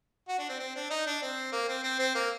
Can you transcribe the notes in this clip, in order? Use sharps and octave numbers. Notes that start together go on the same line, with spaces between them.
F#4
D4
C4
C4
D4
D#4
D4
C4
A#3
C4
C4
C4
A#3